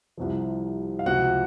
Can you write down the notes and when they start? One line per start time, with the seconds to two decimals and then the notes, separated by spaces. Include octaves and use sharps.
0.17 C2 C3 F3
0.99 F5
1.06 C#2 C3 F3 F#4 F#5